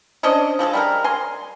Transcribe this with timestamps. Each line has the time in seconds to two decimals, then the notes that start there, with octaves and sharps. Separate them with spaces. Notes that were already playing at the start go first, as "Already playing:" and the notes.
0.23 C#4 D4 C5 D#5
0.59 F3 G#3 G#4 A4
0.73 G3 G#3 A#4
1.04 G#5 C6